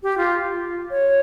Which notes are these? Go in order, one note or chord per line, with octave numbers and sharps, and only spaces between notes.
G4
F4
C#5